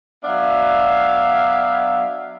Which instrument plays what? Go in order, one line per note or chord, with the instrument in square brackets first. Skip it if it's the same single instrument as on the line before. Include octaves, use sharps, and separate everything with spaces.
[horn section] F#3 B3 D4 E5 F5